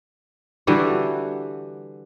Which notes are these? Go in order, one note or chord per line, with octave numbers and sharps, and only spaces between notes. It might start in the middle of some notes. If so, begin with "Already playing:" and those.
D3 E3 G3 F#4